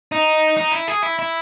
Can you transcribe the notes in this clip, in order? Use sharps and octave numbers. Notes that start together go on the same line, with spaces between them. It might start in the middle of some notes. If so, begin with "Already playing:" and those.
D#4
D#4
E4
G#4
E4
E4